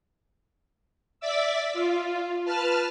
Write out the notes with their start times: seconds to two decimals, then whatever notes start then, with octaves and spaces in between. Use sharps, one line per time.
1.20 D5 E5 D6 E6
1.74 F4
2.45 B4 A5 F6